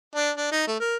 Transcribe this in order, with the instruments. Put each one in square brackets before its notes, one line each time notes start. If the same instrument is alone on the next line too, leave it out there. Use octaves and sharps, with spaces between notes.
[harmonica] D4
D4
D#4
A3
A#4